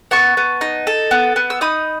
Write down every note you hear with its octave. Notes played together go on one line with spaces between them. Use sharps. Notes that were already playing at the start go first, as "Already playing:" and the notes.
B3 A5 C#6
B3
D#4
A4
B3
B3
E6
D#4 B5 D#6